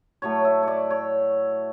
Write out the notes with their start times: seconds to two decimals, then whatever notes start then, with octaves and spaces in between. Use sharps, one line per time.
0.22 A2 F#3 A3 C#5
0.45 E5
0.63 C#5 D5
0.90 C#5